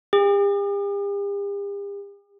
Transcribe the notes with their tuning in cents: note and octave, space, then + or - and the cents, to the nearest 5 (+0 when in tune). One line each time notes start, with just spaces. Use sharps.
G4 +45